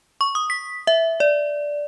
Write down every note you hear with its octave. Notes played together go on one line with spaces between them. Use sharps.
C#6
D#6
B6
E5
D5